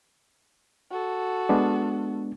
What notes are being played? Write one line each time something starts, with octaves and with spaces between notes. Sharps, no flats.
F#4 A4
G#3 B3 D4